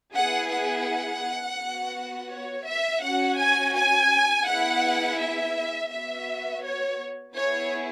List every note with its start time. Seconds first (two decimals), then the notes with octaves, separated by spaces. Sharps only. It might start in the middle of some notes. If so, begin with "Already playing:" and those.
0.13 B3 E4 G#4 F#5
0.50 F#5
1.58 B3 F#4
2.30 C#5
2.66 E5
3.02 C#4 F#4 F#5
3.38 G#5
3.74 G#5
4.47 B3 E4 G#4 F#5
5.19 E5
5.91 B3 F#4 E5
6.63 C#5
7.35 B3 E4 G#4 C#5